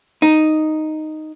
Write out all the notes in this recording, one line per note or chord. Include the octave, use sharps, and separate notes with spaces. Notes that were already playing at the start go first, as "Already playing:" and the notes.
D#4